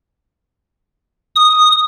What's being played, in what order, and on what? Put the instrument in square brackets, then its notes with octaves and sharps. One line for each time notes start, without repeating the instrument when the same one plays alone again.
[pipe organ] D#6